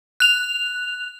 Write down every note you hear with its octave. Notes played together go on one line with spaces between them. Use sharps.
F#6 F7